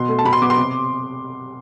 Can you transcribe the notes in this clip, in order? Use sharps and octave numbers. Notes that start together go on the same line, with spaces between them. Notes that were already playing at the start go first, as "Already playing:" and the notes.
Already playing: B2 C6
A3
A5
B2 B5
C6
B3 D6
C6
C3